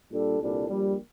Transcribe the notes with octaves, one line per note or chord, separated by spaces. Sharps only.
A#2 G3 D4 A4
C2 A#2 G3 D4 A4
A#1 A#2 G3